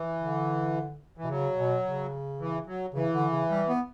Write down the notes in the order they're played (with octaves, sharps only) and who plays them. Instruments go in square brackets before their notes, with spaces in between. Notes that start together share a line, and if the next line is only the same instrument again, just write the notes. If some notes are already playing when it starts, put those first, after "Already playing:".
Already playing: [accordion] E3
[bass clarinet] D3
[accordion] E3
[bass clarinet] B2
[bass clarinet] C#3 [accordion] F#3
[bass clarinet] B2
C#3
[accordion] E3
F#3
[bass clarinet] C#3 [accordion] E3
[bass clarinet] D3
C#3
G3
B3